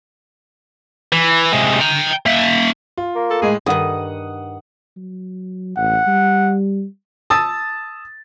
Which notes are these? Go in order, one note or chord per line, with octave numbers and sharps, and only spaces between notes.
E3
C3 G#3
G5 A#5
A#3 E5
F4
A#3
A4
A2 G#3 G#4
G2 D#3 F#5 D#6
F#3
A1 F#5
G3
A5 D#6 E6 A6